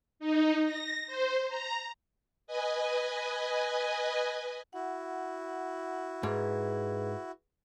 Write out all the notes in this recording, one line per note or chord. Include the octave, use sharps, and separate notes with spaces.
D#4
A#6
C5
A#5
B4 D#5 G#5
E4 F#4 F#5
G#2 G#4 B4